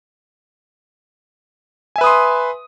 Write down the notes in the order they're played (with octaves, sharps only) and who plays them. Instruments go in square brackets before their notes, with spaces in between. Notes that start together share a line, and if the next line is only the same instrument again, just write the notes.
[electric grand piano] G#5
E5
B4
D#6
C6